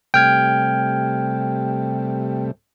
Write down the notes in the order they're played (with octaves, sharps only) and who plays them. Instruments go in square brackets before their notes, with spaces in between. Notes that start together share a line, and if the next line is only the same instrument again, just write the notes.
[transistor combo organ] C3 G3 A3 [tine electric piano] G5 F6 G#6